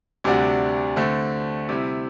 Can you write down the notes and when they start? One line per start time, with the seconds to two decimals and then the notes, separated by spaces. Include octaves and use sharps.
0.24 D2 C3 G3 D4 F#4
0.96 D3 A3 C4
1.69 C3 G3 C4 E4